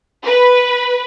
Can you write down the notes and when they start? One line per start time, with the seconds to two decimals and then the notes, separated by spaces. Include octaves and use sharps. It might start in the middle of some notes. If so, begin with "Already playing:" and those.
0.24 B4